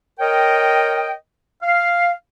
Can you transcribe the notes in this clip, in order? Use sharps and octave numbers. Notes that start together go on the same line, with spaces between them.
A#4 C#5 D#5 G5
F5